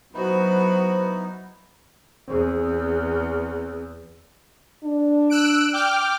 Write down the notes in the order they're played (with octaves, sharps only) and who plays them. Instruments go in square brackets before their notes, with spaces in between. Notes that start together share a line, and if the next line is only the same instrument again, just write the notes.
[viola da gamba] F#3 F#4 [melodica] B3 D#4 E4 [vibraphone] B4 C5
[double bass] E2 [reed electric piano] C4 G#4
[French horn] D4
[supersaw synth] E6 F#6 D7
G5 D6 F6